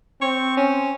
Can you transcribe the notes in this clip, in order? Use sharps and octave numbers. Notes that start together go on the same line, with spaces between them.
C4 C#6
C#4